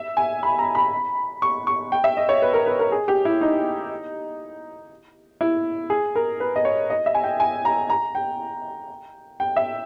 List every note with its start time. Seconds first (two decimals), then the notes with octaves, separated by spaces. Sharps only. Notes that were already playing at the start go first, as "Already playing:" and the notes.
Already playing: E5
0.17 G#5
0.43 B5
0.59 A#5
0.75 B5
1.42 C#6
1.67 C#6
1.92 G5
2.04 E5
2.17 D#5
2.29 C#5
2.42 B4
2.53 A#4
2.66 B4
2.79 A#4
2.92 G#4
3.08 G4
3.25 E4
3.41 D#4
5.41 E4
5.90 G#4
6.15 A#4
6.40 B4
6.56 D#5
6.65 C#5
6.90 D#5
7.06 E5
7.15 G#5
7.24 G5
7.40 G#5
7.65 A#5
7.90 A#5
8.15 G5
9.40 G5
9.56 E5